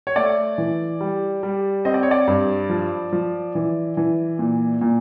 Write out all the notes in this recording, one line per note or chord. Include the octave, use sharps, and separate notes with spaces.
C#5
A3 D5
E3
G3
G3
C4 D#5
D5
C#5
D5
G2
F3
F3
E3
E3
A#2
A#2